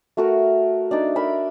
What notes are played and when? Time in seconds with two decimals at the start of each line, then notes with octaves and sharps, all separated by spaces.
0.17 A3 F#4 A#4
0.91 D4 D#4 D5
1.16 A#4 E5 B5